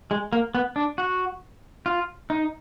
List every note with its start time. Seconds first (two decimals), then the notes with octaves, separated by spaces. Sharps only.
0.11 G#3
0.33 A#3
0.55 B3
0.76 D4
0.98 F#4
1.86 F4
2.30 D#4